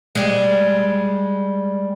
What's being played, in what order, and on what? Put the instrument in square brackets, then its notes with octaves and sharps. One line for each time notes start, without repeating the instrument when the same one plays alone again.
[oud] G3 G#3